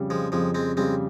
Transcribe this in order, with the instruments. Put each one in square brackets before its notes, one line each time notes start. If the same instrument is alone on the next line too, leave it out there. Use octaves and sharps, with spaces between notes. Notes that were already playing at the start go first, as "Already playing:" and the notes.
Already playing: [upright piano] F2 C#3 G3
[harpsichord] F3 G#3
[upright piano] F2 [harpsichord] F3 G#3
[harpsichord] G#3 C4
[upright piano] C#3 G3 [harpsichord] G#3 C4